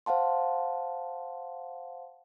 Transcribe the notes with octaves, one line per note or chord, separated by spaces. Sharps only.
C5 F5 F#5 A5 C6